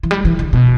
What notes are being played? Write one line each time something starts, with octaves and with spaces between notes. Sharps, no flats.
E3
G3
E3
D3
B2